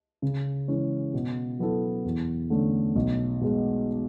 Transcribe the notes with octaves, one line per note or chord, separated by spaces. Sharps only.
C#3
E3 G#3 C#4
B2
F#3 B3 E4 A4
E2
D3 A3 C#4
B1
B2 G#3